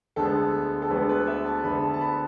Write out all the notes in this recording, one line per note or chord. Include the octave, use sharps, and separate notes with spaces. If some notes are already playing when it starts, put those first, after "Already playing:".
D2 D3 G#3 B3 A4
A4
D2 D3 G#3 B3 B4
B4
E5
A5
D2 D3 G#3 B3 B5
A5
A5
B5